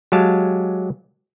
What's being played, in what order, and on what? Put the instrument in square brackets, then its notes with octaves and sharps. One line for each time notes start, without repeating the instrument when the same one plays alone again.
[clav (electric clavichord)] F#3 G#3 G4 F5 A5